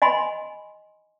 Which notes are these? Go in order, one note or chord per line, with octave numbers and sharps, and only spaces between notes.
D#5 G#5 B5 C6